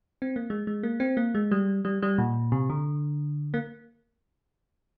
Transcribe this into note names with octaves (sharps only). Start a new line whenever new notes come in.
C4
A#3
G#3
G#3
A#3
C4
A#3
G#3
G3
G3
G3
A#2
C3
D3
A#3